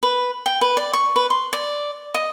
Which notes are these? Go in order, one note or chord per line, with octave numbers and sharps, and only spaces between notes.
B4
G5
B4
D5
C#6
B4
C6
D5
D#5